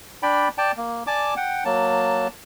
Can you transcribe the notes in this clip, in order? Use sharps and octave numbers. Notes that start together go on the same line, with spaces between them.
D4 D5 G5 B5
D5 G5 A5
A#3
D5 G#5 A5 D6
F#5 G5
F#3 A#3 A5